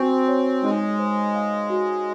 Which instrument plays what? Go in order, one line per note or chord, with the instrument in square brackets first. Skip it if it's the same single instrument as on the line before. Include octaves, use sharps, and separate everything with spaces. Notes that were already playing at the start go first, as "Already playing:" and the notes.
Already playing: [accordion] C4 [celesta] F#4 G#5 C#6
[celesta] C#5
[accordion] G#3 [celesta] D#4
[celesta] C5
F5
F#4